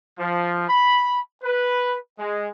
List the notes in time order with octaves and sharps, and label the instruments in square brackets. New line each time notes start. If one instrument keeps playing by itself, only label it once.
[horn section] F3
B5
B4
G#3